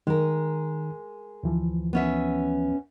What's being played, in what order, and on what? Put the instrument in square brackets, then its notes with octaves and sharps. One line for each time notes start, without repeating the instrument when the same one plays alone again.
[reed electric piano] D#3 [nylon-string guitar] G#3 A#4
[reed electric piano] D2 E3 F3
[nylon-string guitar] B3 C#4 E5